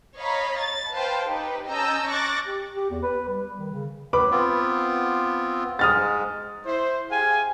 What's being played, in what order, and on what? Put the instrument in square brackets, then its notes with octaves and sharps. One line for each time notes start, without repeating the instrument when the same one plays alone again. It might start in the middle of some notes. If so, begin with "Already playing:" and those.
[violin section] C#5 D#5 F5 A#5 B5
A6
B4 C5 F5 G5 A5
D#4 G4 B4
C#4 D#5 A5 A#5 E6 G6
C#6 D6 F#6 A6 A#6
[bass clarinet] G4
G4
E2
B4
G3
D#3
C#3
[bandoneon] A2 [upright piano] B4 B5 D6
[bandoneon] B3 C4 F4
[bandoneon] G#2 G#3 [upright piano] D#6 F6 A6
[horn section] E4 C5
G4 G#4 F5 G#5